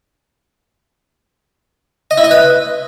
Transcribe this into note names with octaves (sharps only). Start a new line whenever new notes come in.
D#5
E4
D#5
B4